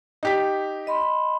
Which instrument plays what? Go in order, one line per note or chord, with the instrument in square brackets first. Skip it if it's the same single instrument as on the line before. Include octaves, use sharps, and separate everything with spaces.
[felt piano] D#4 G4 B6
[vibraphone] D#5 B5 C6